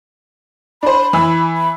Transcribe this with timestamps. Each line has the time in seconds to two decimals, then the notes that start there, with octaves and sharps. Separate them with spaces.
0.83 D4 C5 B5
1.13 E3 E6
1.56 B5